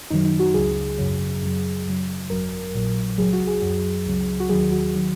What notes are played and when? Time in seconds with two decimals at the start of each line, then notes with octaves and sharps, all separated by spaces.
0.10 F#2 D#3 F#3 D#4
0.25 D#4
0.39 F#4
0.54 C#2 C#3 F#3 G#4
0.98 G#1 F#2 C#3 F#3
1.42 F#2 C#3 F#3
1.86 F#2 C#3 F#3
2.30 G#1 F#2 F#3 A#4
2.74 A#1 A#2 F#3
3.18 C#2 C#3 F#3 G#4
3.33 F#4
3.47 G#4
3.62 F#2 F#3
4.06 C#2 C#3 F#3
4.40 F#4
4.49 D#2 D#3 F#3 G#4
4.71 F#4
4.95 D#3 F#3